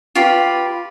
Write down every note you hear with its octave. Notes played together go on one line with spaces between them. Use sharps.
F4 G4 B4 B5